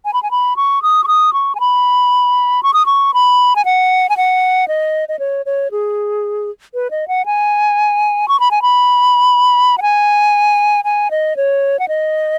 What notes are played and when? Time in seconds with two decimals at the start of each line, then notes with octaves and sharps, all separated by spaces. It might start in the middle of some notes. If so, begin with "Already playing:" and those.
0.05 G#5
0.13 B5
0.23 G#5
0.31 B5
0.56 C#6
0.82 D#6
1.04 C#6
1.08 D#6
1.33 C#6
1.55 G#5
1.60 B5
2.63 C#6
2.74 D#6
2.86 C#6
3.14 B5
3.56 G#5
3.65 F#5
4.09 G#5
4.17 F#5
4.68 D#5
5.09 D#5
5.19 C#5
5.46 C#5
5.71 G#4
6.74 B4
6.91 D#5
7.08 F#5
7.26 G#5
8.28 C#6
8.40 B5
8.51 G#5
8.62 B5
9.78 F#5
9.82 G#5
10.84 G#5
11.11 D#5
11.37 C#5
11.79 F#5
11.88 D#5